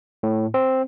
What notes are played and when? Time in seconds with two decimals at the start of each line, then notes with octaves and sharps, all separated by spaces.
0.23 A2
0.54 C4